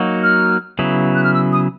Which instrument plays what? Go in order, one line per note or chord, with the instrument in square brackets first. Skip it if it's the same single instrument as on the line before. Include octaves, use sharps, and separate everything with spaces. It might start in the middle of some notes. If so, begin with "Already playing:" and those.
Already playing: [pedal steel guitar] F#3 A#3 D#4 F#4
[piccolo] F6
[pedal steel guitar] C#3 F#3 B3 E4
[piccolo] F#6
F6
E6
D#6